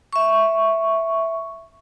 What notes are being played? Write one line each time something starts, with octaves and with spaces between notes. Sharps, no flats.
E5 C#6